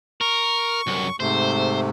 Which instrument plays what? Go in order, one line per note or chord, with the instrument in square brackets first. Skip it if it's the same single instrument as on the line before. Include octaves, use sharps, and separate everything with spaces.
[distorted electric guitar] A#4 [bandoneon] C#6
[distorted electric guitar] C2 F#2
[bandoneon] G#2 C3 A3 [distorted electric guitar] C5